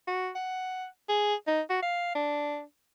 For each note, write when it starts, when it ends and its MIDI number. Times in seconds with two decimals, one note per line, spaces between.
0.07 0.30 66
0.35 0.86 78
1.09 1.35 68
1.47 1.61 63
1.70 1.82 66
1.83 2.11 77
2.15 2.62 62